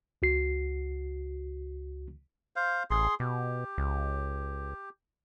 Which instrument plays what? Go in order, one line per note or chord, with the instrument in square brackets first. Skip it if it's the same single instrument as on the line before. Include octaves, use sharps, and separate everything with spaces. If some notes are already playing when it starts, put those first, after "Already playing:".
[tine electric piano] C#2 F#4 C7
[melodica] C5 F5
[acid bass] A1 [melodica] G#4 C6
[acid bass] B2 [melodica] G4
[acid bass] C#2